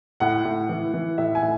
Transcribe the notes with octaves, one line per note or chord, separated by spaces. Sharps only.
A2 F#5
A2
E3
E3
A2 E5
G#5
A2